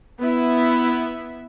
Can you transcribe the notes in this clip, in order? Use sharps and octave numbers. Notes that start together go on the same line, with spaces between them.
B3 E4 E5